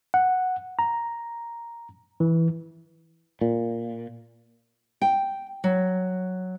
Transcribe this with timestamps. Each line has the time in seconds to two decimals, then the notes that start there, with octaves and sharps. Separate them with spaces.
0.14 F#5
0.79 A#5
2.20 E3
3.41 A#2
5.01 G5
5.64 F#3